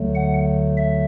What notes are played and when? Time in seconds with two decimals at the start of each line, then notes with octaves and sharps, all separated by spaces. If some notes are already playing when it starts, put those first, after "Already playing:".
Already playing: D2 D3 F#3 A3
0.15 F#5
0.77 E5